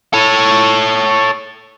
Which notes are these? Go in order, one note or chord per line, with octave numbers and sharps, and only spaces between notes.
A4 C#5